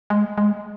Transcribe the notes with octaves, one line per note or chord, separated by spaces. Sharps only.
G#3
G#3